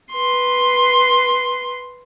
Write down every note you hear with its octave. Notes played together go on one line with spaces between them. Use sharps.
B4 C6